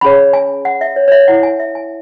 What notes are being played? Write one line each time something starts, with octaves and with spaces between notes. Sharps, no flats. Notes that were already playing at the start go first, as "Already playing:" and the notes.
C#4 G#4 C#5 B5
G#5
F#5
E5
C#5
C#5
E5
E4 C#5 F#5
G#5
E5
G#5